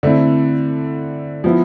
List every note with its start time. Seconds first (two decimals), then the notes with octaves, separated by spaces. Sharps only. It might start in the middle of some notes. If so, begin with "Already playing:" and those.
0.03 D3 A3 C4 E4
1.44 F3 B3 E4